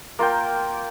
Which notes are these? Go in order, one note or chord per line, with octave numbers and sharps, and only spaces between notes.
A#3 F4 A#4 G5